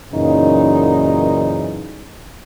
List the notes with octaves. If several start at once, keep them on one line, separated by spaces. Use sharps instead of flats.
F#2 A#2 C#3 E3 D#4